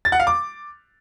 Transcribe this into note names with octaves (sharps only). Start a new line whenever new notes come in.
A6
F#5
F5
D6